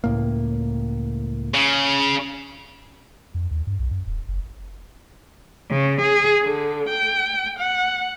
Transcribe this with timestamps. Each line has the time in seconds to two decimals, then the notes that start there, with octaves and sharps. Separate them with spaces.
0.04 C#2 A2 A#3
1.54 C#3
3.34 F2
3.51 D#2
3.67 G2
3.79 B1
3.91 F#2
4.07 D#1
4.28 F#1
5.70 C#3
6.02 G#4
6.42 D3
6.88 G5
7.58 F#5